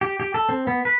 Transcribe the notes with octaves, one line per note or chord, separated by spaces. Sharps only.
G4
G4
A4
C4
B3
B4